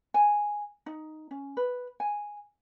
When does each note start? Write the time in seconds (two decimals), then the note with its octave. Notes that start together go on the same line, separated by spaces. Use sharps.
0.14 G#5
0.86 D#4
1.31 C#4
1.57 B4
2.00 G#5